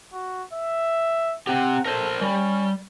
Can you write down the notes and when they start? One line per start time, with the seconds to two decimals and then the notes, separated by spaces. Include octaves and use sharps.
0.13 F#4
0.53 E5
1.47 C4 G4 F#5
1.86 A4 A#4 C5
2.21 G3 C#4